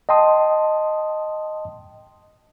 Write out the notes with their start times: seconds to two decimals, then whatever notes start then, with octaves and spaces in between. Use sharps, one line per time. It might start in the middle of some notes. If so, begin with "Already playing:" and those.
0.09 D#5 G5 A5 C6 D#6